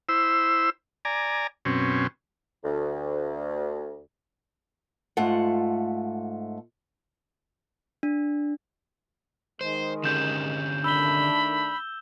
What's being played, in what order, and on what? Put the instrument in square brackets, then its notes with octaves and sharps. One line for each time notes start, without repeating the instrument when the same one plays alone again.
[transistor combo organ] E4 C5 E6
D5 G#5 A#5
F#2 B2 C4 C#4
[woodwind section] D2
[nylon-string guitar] G#2 A3 F4 F#5
[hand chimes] D4
[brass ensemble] D#3 G#3 [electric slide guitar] C5
[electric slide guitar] D3 C#4 G4 [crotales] G6 E7
[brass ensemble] D#3 A3 D4 [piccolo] B5 [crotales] E6 G7